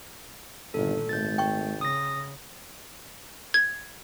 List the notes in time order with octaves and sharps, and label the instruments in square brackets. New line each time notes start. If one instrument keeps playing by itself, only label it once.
[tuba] G1 [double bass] A#2 D#3 [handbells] A4
[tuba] G#1 [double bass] A3 [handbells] G6 A6
[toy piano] G5 C#6
[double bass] C#3 [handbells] D#6 A#6
[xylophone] G#6